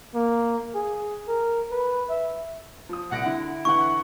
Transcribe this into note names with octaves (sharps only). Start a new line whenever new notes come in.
A#3
G#4
A#4
B4
E5
F3 D#6
C2 F#5 A#6 D7
D3 E4
D3 E3 F#5 C#6